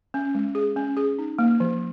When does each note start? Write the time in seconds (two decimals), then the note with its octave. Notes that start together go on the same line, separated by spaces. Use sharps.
0.14 C#4
0.35 G#3
0.55 G#4
0.76 C#4
0.97 G#4
1.19 D#4
1.39 A#3
1.60 F3